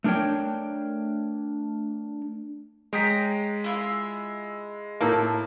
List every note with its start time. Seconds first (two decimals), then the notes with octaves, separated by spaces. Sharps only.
0.04 A3 D4 A#4 C#5 G5
2.93 G#3 C#5 G5 A#5 D#6 B6
3.64 E4 F4 E5
5.01 A2 A#3 A5 E6